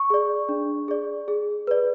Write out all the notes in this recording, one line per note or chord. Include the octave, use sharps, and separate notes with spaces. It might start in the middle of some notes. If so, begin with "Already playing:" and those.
Already playing: C#6
G#4 D5
D4
G#4 D5
G#4
B4 D5